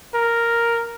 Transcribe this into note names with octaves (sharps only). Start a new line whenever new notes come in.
A#4